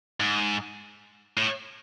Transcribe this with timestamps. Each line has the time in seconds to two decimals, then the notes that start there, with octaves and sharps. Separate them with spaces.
0.20 G#2
1.37 A2